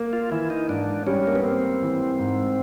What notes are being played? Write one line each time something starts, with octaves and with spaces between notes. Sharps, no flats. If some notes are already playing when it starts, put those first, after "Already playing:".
Already playing: A#3
F4
E3 E4
D#4
G#2 D4
G3 C#4
A#3
B3
A#3 C4
E3
G#2